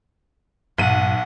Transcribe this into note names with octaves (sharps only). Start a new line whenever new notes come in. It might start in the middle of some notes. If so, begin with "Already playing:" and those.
B1 G2 A#2 F#5 D#7